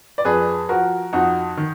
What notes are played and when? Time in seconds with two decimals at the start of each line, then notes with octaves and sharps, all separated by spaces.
0.18 D5
0.25 F2 G#4 B4
0.69 F3 F#4 A#4
1.13 F2 D#4 F#4
1.57 D#3